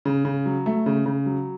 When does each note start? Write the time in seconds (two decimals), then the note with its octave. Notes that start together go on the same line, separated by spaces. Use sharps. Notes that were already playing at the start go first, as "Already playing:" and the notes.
0.05 C#3
0.25 C#3
0.46 F#3
0.66 A3
0.86 C#3
1.06 C#3
1.26 F#3